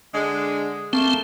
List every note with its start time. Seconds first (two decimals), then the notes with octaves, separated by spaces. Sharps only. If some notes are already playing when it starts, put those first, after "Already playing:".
0.14 D3 G#3
0.93 A3 A#3 C4